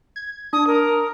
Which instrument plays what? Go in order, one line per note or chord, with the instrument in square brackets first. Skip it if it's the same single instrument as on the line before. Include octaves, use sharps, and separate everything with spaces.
[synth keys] G#6
[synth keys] D4 [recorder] D#6
[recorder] A#4